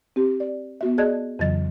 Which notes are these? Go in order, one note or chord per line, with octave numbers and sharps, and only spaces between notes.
C4 G4
D5
B3 F#4 E5
G#4 D5 D#5 A5 F#6 G#6
F2 C#3 E3 F#3 D#5 A6